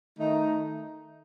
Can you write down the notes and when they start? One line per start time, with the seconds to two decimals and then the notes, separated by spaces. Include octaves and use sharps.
0.18 D#3 A3 D#4